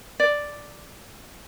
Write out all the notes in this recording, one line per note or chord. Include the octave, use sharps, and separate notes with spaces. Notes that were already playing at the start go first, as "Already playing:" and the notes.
D5